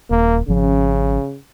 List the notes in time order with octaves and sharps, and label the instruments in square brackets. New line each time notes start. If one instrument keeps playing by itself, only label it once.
[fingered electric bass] D#1 [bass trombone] A#3
[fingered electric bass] G#1 F3 C#4 [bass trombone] C#3